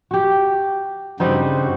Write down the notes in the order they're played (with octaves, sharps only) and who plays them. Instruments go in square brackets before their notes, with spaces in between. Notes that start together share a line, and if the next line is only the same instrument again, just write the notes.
[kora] F#4 G4
[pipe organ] G2 C#3 F#4 [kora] G3 C4 D#4